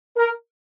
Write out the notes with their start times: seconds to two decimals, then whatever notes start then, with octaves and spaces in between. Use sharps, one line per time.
0.17 A#4